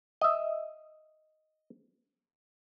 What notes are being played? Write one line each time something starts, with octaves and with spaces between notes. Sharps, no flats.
D#5 E5